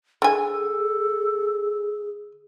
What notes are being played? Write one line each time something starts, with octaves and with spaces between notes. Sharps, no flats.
D3 G#4 A4 G#5